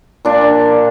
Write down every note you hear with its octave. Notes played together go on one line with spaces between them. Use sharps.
A#2 D4